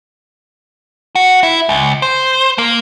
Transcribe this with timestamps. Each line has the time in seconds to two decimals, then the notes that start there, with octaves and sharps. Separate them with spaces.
1.15 F#4
1.43 E4
1.69 C#2
2.02 C5
2.58 A#3